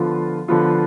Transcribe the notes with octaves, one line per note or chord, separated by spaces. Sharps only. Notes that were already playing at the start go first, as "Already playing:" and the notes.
Already playing: D3 F3 B3 F4
D3 F3 B3 F4